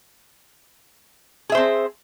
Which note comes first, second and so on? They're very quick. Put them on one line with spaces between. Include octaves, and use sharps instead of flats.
G#4 E5 C5 C4